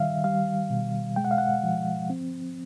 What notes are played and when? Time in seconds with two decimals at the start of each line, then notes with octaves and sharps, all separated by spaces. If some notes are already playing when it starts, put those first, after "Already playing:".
Already playing: D#3 G3 E5 F5
0.24 G3 F5
0.70 B2
1.16 G#3 G5
1.25 F#5
1.31 F5
1.38 F#5
1.63 F3
2.10 C4